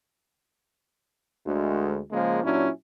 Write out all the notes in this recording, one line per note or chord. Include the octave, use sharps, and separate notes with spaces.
D2 G#3
C#3 F3 G#3 A#3
A#2 F#3 C#4 D4 E4